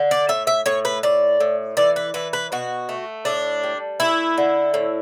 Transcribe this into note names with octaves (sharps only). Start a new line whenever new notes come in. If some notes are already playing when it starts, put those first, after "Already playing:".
Already playing: D3
D5
A2 E5
E5
A2 C#5
B4
A2 D5
A2
E3 D5
B4
E3 B4
B4
B2 F#4
A3
A2 D4
G3
A3 E4
D3
A2